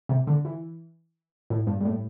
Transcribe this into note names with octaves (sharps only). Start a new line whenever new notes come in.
C3
D3
E3
A2
G2
G2
A2